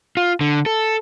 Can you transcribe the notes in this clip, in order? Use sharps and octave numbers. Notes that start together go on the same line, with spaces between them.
F4
D3
A4